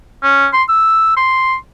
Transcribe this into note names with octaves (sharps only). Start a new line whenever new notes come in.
C#4
C6
E6
C6